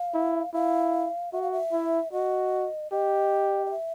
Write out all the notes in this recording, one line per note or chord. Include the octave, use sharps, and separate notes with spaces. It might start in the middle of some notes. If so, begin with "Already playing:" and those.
Already playing: F5
E4
E4 F5
F#4 E5
F5
E5
E4
F#4 D#5
G4 D#5
D#5
E5